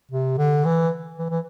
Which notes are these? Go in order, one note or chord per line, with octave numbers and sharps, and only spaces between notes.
C3
D3
E3
E3
E3